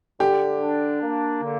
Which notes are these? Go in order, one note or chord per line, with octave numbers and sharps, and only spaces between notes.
D3 G4
D4
A#3
D3